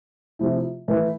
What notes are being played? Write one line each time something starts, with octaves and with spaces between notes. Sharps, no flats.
C3 F3 A3 E4
E3 A3 E4 B4